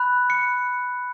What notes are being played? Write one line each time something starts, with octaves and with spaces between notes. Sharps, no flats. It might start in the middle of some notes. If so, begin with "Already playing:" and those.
Already playing: B5 F#6
C#7